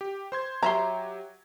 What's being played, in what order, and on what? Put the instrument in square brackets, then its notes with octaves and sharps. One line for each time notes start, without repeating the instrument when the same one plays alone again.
[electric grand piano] G4
C5 C6 G#6
[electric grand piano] F#3 G4 [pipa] C#5 E5 C6 [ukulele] A#5